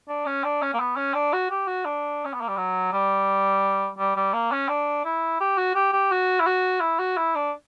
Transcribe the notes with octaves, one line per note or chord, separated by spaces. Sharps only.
D4
C#4
D4
C#4
A#3
B3
C#4
D4
F#4
G4
F#4
D4
C#4
B3
A#3
G3
F#3
G3
G3
G3
A#3
C#4
D4
E4
G4
F#4
G4
G4
F#4
E4
F#4
E4
F#4
E4
D4